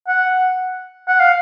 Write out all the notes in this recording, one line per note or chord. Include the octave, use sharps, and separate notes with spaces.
F#5
F#5
F5